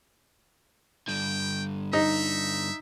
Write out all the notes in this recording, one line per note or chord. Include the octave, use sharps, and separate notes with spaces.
G2 D3 G5
D#4 E5